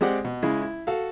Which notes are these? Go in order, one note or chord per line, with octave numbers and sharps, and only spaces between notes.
G#3 C4 G4 D5 F#5
B2
C#3 G#3 E4
E4
F#4 A4 F5